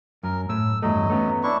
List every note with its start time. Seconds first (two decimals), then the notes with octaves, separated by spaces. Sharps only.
0.23 F#2 A#4
0.49 A2 E6
0.82 E2 G2 F#3 A3 D#5
1.10 A3 B3 C#4
1.43 D4 E4 C#6